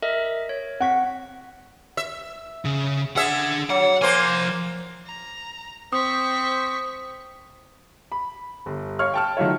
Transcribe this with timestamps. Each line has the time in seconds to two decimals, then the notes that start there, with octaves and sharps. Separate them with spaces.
0.03 A#4 D#5 E5
0.49 C#5
0.81 C4 F#5 C#6 B6
1.97 E5
2.65 C#3
3.16 D4 G#4 E5 F#5
3.70 F#3 F#5
4.02 F3 A#3 C5 G#5
5.06 A#5
5.93 C4 C5 C#6 D#6 B6
8.12 B5
8.66 G1
8.99 C#5 F5 C#6 F6
9.14 G5 A5 F6
9.37 D#3 F#3 A3 F4 C#5